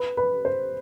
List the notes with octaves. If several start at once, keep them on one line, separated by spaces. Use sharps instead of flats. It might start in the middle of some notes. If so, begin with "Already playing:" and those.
Already playing: B4
B4
C5